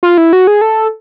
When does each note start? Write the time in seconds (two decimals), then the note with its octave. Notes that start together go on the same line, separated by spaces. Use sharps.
0.03 F4
0.18 E4
0.33 F#4
0.47 G#4
0.61 A4